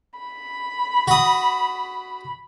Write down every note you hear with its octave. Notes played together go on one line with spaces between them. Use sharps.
B5
F#4 D#6